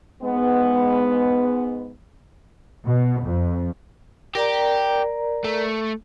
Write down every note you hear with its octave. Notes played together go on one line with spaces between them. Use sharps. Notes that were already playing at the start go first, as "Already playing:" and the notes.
G#2 G#3 B3
B2
F2
G4 A#4 D5 A#5
A3